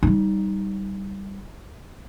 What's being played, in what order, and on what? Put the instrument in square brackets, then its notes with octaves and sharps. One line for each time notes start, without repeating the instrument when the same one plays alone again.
[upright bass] G3 D#4